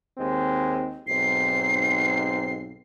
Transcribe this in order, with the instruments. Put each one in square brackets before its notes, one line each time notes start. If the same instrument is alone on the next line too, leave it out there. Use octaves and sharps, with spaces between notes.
[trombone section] D#2 G#3 C4
[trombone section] B1 G#2 C4 [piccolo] C7